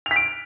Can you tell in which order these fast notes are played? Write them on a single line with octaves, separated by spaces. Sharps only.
F7 B6 D7